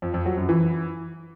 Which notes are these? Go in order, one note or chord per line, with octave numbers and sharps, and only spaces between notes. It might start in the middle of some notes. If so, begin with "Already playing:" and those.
F2
F2
F#3
F#2
E3